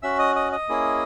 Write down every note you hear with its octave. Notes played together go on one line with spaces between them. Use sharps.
C#4 F#4 E5 E6
D#5 D#6
D#5 D#6
D#5 D#6
A#3 C#4 E4 G#4